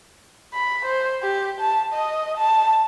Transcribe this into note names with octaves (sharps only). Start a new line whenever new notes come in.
B5
C5
G4
A5
D#5
A5